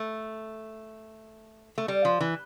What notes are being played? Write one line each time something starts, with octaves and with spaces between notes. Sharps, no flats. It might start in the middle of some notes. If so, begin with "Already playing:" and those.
Already playing: A3
A3
G3
F3
E3